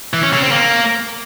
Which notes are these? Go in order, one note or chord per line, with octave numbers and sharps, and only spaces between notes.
E3
C#4
C#3
C4
A#3